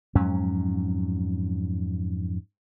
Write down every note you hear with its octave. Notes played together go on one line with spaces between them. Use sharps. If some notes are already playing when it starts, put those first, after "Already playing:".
F2 G#2 F#3 C#4